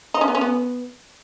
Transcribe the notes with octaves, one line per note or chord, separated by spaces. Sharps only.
D#4
C#4
B3
C#4
B3